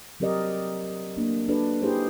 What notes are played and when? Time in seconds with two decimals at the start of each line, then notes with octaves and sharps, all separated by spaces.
0.20 F#3 C4 G4 A#4 D5 D#5
1.17 A3 A#3 D4
1.48 D4 F#4 A4 B4 D5
1.82 D#4 E4 G4 G#4 B4 C5